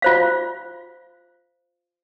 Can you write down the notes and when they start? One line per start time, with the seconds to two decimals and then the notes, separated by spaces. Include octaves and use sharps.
0.02 F4 C5 F5